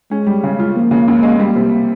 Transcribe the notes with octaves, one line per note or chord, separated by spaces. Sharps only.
G#3 C#4
G3
C#3
F4
F3 A#3
C#3
C#2
G#3
G3 A#3
C3